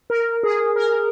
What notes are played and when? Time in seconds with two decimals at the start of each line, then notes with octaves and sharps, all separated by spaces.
0.10 A#4
0.43 G#4
0.76 A#4